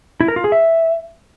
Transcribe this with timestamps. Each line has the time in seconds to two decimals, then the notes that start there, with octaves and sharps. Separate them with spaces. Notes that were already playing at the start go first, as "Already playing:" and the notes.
0.20 E4
0.28 A#4
0.36 F4
0.44 G#4
0.52 E5